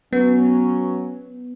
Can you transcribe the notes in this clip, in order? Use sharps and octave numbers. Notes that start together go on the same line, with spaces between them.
F#3 B3 C#4